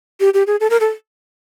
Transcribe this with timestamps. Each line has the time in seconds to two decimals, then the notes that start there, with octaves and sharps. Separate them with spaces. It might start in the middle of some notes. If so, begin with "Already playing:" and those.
0.20 G4
0.34 G4
0.47 G#4
0.60 A4
0.70 A#4
0.80 A4